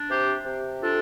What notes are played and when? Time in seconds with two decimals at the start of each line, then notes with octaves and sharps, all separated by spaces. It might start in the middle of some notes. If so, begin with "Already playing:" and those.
Already playing: D4
0.09 C3 G4 C5
0.45 C3
0.81 D4 F4 A4